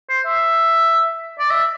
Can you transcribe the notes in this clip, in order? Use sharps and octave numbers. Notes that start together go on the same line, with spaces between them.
C5
E5
D5
E5